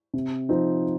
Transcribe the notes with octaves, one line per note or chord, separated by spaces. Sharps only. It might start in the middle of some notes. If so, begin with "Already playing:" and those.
C3
F3 C4 D#4